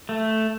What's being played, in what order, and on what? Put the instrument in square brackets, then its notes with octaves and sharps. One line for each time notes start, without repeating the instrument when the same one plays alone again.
[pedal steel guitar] A3